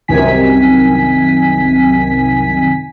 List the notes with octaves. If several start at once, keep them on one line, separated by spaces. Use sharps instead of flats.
C2 F#2 C3 D#3 G#5 B6